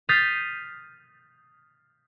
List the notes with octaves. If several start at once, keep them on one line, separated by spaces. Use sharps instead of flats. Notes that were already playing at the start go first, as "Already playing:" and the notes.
D#6 F6 G6 A6 B6 C7